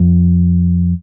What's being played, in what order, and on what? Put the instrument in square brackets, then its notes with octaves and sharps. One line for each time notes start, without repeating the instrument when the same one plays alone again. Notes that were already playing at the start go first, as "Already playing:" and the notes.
Already playing: [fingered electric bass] F2